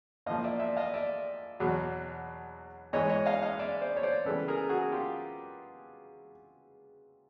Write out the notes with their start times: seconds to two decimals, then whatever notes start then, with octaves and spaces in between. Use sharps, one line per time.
0.26 A2 F3 A#3 D#5 F5
0.44 D5 E5
0.60 D5 E5
0.77 D#5 F5
0.94 D5 E5
1.60 E2 B2 F#3
2.93 G#2 E3 G#3 C#5 D#5
3.09 C#5 D#5
3.26 D#5 F5
3.42 D#5 F5
3.59 D5 E5
3.81 C5 D5
3.97 C#5
4.03 C5 D5
4.25 C#3 E3 G3 B3 A4 B4
4.48 G#4 A#4
4.69 F#4 G#4
4.92 F4 G4